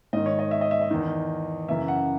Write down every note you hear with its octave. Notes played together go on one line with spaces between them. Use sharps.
G#2 D#3 D#5
C#5
D#5
E5
D#5
E5
D#5
E2 D#3
F#2 C#3 E3 E5
F#5